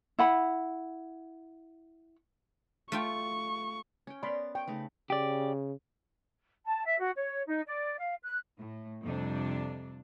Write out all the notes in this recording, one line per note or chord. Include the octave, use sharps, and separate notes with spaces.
E4 F#5 B5
A3 F4 G5 C#6
C#4 G5
B3 A#4 D5 B5 C6
C#5 G5
C#3 A3 D#4 B4
C#3 G4 D5
A5
E5
F#4
C#5
D#4
D5
F5
F#6
A2
F2 C3 G3 D4